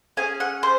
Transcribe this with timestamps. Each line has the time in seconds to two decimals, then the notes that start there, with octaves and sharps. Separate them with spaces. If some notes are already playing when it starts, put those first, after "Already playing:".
0.17 C#4 G#4 G#5
0.40 F#5
0.63 C5